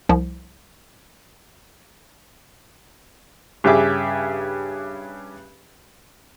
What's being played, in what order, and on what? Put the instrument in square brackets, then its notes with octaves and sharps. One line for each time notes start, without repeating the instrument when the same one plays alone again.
[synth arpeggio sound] C2 F3
[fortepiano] G2 C#3 G4 G#4 E5 D6